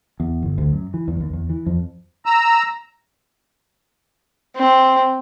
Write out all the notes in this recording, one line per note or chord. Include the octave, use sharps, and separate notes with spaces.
E2
G1
D2
F#2
E3
E2
D#2
E2
E3
F2
A#5 E6
C4